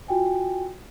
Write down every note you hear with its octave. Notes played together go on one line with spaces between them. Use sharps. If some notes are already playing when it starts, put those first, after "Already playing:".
F4 F#4 G5 G#5